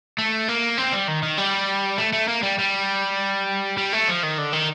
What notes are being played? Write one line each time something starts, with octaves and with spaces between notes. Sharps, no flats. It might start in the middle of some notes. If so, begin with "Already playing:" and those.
A3
A#3
C4
G3
D#3
D#3
G3
A3
A3
A#3
G3
G3
G3
A3
F3
D#3
D3
D#3